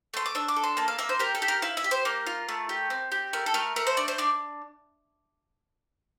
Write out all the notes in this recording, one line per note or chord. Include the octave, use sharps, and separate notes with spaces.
A3 C6
D6
D4 E6
D6
A4
C6
A#3 A5
F5
A#3 E5
C5
G4 A#4
A4
G4
A#4
E4 F5
E5
G4
C5
A#3 A#4
F4
A3
G4
C4
G4
A3 A#4
A4
A3 A#4
A3 A#4
C5
D4 D5
C5
D4 D5